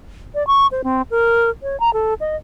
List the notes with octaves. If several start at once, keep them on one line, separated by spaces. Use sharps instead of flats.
D5
C#6
C5
C4
A#4
C#5
A#5
A4
D#5